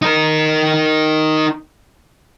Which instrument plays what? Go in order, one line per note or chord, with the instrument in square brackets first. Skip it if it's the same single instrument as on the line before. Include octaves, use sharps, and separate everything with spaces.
[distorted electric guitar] D#4 A#4